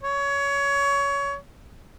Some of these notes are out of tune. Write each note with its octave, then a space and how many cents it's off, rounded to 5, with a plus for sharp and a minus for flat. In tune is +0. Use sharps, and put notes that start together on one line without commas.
C#5 +20